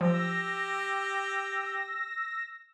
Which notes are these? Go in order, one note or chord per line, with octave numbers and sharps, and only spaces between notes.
F3 G4 E6 A#6